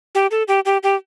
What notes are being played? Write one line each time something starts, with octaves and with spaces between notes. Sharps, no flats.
G4
A4
G4
G4
G4